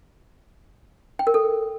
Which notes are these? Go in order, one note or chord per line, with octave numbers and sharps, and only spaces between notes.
G5
A#4
A4